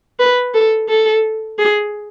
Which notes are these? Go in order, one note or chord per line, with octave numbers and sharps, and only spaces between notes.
B4
A4
A4
G#4